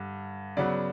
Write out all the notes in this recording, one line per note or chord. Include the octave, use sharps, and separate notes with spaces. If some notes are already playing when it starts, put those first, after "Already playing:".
Already playing: G2 D3
C#3 F#3 B3 D5